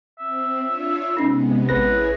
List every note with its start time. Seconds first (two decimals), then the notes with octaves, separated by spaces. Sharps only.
0.19 C4 E5
0.60 D4 F4 C#5
1.17 C3 G#3 B3 C#4 D#4
1.69 A1 E4 G#4 B4 C#5 F#5 A#6